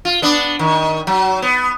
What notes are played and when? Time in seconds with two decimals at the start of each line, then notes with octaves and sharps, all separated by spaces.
0.05 F4
0.22 B3 D4
0.59 D#3
1.07 F#3
1.42 B3